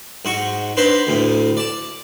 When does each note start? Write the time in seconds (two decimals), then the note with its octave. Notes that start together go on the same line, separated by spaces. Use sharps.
0.25 G#2 F#4 C#6
0.77 D4 B4 C5 A#5
1.07 D2 A2
1.57 D5 A5